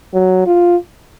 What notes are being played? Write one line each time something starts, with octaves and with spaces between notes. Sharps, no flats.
F#3
F4